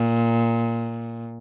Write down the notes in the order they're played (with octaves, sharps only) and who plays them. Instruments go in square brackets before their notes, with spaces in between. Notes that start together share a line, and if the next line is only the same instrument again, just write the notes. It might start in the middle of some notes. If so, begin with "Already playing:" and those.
Already playing: [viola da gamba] A#2